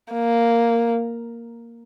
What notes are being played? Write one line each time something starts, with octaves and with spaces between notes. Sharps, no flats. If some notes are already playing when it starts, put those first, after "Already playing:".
A#3